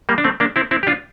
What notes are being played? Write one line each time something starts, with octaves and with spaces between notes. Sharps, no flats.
G3 A#3
D4
A3 C4
A#3 D4
C4 E4
C4 E4
G4
D4 F4